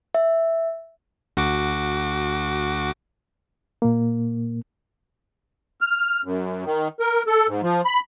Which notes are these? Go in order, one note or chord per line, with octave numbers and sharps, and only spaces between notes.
E5
D2 F#4 D6
A#2 A#3
F6
F#2
D#3
A#4
A4
G#2
F3
B5